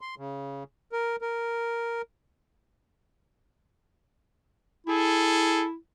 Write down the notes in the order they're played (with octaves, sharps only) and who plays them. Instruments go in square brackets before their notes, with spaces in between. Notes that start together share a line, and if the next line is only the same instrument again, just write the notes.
[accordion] C6
C#3
A#4
A#4
[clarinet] E4 [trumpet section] G#4 A4